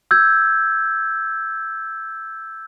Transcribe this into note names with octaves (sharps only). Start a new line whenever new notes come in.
E6 G6 G#6